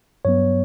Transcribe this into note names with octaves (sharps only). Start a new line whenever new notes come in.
G2 F#3 B3 C#5